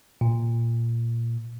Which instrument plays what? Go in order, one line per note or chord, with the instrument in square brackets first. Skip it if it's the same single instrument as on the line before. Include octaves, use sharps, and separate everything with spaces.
[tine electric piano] A#2